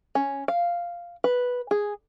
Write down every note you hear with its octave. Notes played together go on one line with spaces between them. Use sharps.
C#4
F5
B4
G#4